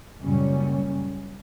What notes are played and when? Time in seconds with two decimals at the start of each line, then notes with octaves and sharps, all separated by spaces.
0.22 F#1 F#2 A#2 G3 C#4